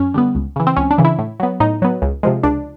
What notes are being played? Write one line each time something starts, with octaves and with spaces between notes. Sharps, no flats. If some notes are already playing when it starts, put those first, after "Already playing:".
Already playing: F#2 C#4
D3 G3 B3
C#2
C#3 E3
C4
C#2 C#4
D4
C#3 E3
E4
A2
F#3 B3
A2 D#4
F#3 B3
C#2
C3 F3 G#3
C#2 D4